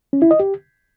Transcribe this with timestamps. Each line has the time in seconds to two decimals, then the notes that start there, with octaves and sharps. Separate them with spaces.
0.13 C#4
0.22 E4
0.31 D#5
0.40 G4